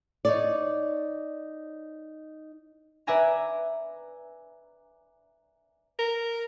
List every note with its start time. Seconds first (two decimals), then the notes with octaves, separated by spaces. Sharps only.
0.25 D#4 C#5 D5
3.07 B4 D5 E5 G#5 A#5 G#6
5.99 A#4